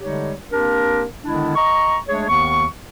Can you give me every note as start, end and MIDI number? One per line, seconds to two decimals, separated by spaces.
0.01 0.32 50
0.01 0.32 55
0.01 0.32 56
0.01 0.32 63
0.01 0.32 67
0.01 0.32 73
0.52 1.03 58
0.52 1.03 60
0.52 1.03 62
0.52 1.03 67
0.52 1.03 70
1.23 1.53 50
1.23 1.53 51
1.23 1.53 56
1.23 1.53 59
1.23 1.53 62
1.23 1.53 64
1.56 1.96 75
1.56 1.96 82
1.56 1.96 85
2.08 2.26 56
2.08 2.26 57
2.08 2.26 62
2.08 2.26 68
2.08 2.26 73
2.28 2.65 39
2.28 2.65 51
2.28 2.65 59
2.28 2.65 85